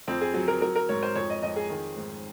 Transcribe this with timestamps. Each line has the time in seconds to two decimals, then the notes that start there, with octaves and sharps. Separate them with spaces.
0.08 F2 C4
0.21 G#4
0.34 F#3 G#4
0.48 A#4
0.62 F#3 A#4
0.76 A#4
0.89 G#2 C#5
1.03 C5
1.16 F2 C#5
1.30 D#5
1.43 F2 D#5
1.56 G#4
1.70 D#3
1.97 G#2